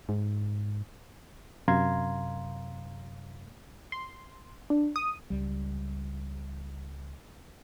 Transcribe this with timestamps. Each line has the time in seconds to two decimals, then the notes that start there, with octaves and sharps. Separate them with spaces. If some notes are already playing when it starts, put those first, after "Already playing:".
0.09 G#2
1.68 F#2 C3 F5 A#5 C6 G#6
3.92 C6
4.70 D4
4.96 D#6
5.30 C#2 G3